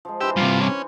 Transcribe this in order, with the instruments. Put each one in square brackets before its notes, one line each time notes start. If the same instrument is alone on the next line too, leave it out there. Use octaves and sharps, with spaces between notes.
[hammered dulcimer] F3 G#3
[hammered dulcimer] E3 D4 C5 [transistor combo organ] G4 E6
[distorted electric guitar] G2 C3 [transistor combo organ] F4
[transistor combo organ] C#4